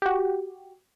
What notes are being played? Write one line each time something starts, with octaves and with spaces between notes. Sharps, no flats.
F#4 G4